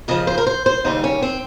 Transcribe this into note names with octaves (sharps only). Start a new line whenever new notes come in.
F2 C#3 F3 D#5
C5
A#4
C5
C5
D#2 C#3 G3 D#4
C#4
C4